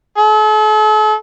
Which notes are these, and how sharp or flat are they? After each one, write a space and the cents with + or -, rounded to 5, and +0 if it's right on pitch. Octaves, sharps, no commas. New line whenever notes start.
A4 -45